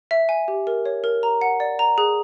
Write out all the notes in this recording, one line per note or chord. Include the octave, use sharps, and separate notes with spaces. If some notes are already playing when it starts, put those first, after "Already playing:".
E5
G#5
G4
A#4
C#5
A#4
A#5
F#5
D5
A#5
G#4